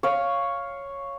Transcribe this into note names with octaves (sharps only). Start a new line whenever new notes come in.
C#5 F5